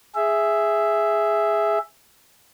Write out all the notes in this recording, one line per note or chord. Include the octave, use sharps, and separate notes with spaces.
G#4 E5